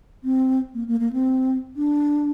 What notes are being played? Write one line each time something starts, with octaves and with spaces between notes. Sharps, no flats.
C4
A#3
A#3
A#3
C4
D4